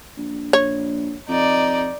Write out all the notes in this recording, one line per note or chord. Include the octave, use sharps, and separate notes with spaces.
A#1
A#1 C#5
F2 D#4 D5